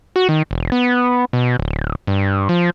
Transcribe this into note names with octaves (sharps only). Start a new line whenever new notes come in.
F#4
D#3
E1
B3
B2
D1
G2
F3